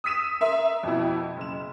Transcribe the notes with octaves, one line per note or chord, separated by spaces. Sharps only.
D#6 E6 B6 D#7 E7
A#4 E5 C6
F2 B2 E4
F#1 E7